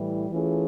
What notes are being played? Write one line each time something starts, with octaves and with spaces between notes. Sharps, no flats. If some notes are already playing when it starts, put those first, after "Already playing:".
Already playing: A2 E3 G3
E3 A3 C#4 F4 G#4